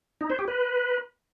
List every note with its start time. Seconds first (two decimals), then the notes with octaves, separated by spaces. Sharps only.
0.21 D#4
0.30 C5
0.39 G4
0.48 B4